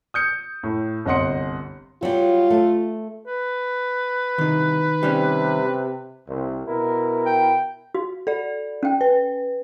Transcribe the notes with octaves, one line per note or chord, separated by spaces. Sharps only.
D#6 G6 C#7
A2
G1 C2 D#5 F#5 C6 C#7
F#3 G3 F4
A3
B4
C2 D#3 D#4
C3 G3 C#4
C2
B2 E4 A#4
G5
F#4
A4 D5
C#4 G5
B4